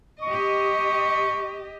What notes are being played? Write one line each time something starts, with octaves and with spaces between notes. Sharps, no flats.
G4 D#5 C#6